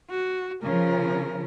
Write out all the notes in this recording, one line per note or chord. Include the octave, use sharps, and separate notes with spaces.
F#4
C#3 F3 A#4